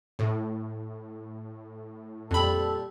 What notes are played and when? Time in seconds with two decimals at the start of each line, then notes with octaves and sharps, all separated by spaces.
0.19 A2
2.31 F2 A#2 G3 A4 B5